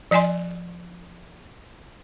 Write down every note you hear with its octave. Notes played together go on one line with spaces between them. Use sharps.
F3 D5 D#5 G#5 C6